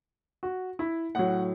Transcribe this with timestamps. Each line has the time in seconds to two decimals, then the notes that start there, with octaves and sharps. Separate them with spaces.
0.43 F#4
0.79 E4
1.15 A2 F#3 F#5